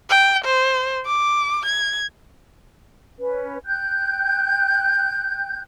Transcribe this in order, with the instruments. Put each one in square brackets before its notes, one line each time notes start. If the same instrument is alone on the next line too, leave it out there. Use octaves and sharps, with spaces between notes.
[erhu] G5
C5
D6
G#6
[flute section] C#4 B4
G5 F#6 G6